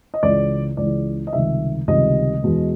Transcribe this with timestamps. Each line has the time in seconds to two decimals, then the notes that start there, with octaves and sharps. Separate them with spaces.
0.14 D#5
0.23 C#2 C#3 E3 G#3 D5
0.77 C#2 C#3 E3 G#3 D5
1.27 D#5
1.32 C#2 C3 D#3 G3 E5
1.88 C#2 C3 D#3 G3 D#5
2.42 E2 B2 G#3